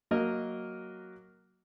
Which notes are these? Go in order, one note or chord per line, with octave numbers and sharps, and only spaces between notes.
F#3 A#3 A#4 D#5 F6